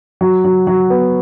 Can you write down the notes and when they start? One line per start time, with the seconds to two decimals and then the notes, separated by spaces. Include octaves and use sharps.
0.21 F#3
0.45 F#3
0.67 F#3
0.90 B3